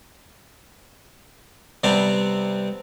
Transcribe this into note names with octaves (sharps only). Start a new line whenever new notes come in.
C3 G3 B3 C4 G5 A5